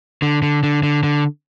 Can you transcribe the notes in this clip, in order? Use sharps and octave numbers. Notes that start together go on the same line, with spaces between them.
D3
D3
D3
D3
D3